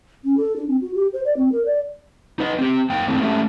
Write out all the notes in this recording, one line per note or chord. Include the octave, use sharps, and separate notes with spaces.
C#4
A4
D4
C4
F#4
G4
C5
D5
C4
A#4
D5
D#4 B4 D#5
C4 G4
F#2 A#3 G5
G#2 C3 E3 A3 C4
G#3 A3 C#4 G4 A4 E5